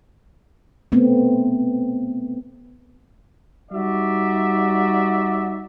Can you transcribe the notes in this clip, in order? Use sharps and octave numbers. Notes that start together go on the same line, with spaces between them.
A3 B3 C4
G3 D#4 F#4 D5 E5